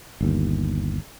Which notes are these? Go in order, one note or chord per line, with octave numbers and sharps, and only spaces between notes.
G1 D#2